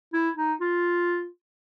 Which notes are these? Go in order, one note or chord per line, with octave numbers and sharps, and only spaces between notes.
E4
D#4
F4